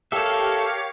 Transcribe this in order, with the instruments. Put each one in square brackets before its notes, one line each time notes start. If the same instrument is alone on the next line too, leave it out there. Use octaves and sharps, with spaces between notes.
[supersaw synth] G4 F5 [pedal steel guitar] A4 E5 [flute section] A#4 C#5